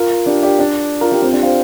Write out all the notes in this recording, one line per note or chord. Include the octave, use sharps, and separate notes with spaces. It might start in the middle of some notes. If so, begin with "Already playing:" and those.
Already playing: F4 A#4
D4 G4
D4 G4
D4
F4 A#4
D4 G4
C4 F4
D4 G4
C5 F5